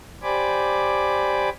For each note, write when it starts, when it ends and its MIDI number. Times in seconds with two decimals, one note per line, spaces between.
0.23 1.50 67
0.23 1.50 72
0.23 1.50 74
0.23 1.50 80
0.23 1.50 83
0.23 1.50 86